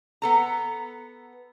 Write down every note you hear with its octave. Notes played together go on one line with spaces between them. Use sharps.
B3 A4 A#5